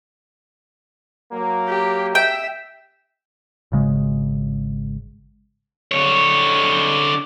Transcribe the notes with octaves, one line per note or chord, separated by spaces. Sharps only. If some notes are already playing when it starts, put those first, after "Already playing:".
F#3 A#3
G4
E5 G5
G#1 C#3 G#3
D3 C#5